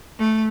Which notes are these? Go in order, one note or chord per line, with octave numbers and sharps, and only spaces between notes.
A3